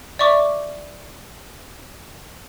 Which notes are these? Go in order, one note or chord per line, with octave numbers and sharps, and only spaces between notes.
D5 E5 C#6 D6